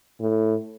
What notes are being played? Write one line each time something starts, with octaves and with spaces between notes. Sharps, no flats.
A2